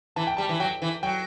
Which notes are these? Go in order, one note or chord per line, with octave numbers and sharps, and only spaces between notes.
E3 A5
G5
G3 A5
E3
F#3 G5
E3
F#3 G5